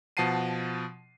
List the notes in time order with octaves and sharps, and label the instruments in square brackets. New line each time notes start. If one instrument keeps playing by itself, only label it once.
[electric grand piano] B2 F3 F#5 A5 C7 D#7